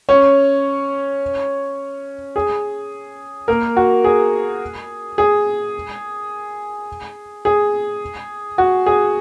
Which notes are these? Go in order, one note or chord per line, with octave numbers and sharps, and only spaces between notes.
C#4 C#5
G#4
A#3 A#4
F#4
G#4
G#4
G#4
F#4
G#4